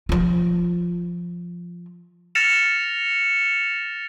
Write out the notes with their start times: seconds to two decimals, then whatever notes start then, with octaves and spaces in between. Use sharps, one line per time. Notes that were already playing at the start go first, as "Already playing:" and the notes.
0.09 F3 F4
2.35 F6 A6 A#6 C#7 E7 F7